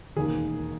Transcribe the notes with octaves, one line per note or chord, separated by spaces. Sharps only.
E1 D#2 D#3 A#3 G#4